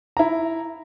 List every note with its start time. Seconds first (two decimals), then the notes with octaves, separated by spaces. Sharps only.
0.17 E4 A#5